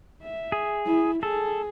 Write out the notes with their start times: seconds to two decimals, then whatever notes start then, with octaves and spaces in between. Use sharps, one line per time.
0.22 E5
0.52 G#4
0.85 E4
1.23 G#4 A4